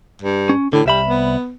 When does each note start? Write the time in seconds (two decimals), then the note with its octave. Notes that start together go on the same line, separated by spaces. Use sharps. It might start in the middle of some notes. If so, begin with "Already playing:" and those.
0.22 G2
0.49 C#4
0.73 A2 D3
0.86 C2 G3 E5 B5
1.07 B3